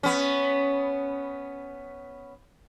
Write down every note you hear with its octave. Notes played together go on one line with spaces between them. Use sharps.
B3 C#4